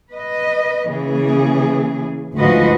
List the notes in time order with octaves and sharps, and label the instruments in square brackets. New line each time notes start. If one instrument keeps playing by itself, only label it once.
[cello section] B4 D#5
C#3 E3 A#3 G#4
D2 G#2 F3 F#4 B4 D#5